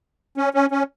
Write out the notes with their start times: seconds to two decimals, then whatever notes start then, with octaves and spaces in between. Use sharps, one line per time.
0.37 C#4
0.54 C#4
0.71 C#4